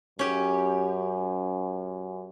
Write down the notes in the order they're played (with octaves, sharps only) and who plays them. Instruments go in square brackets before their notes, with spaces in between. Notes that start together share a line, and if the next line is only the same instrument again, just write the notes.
[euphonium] F#2 [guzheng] C#4 G4